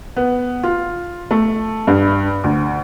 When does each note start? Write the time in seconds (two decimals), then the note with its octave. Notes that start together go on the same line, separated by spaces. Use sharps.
0.16 B3
0.63 F4
1.31 A3
1.87 G2
2.44 D2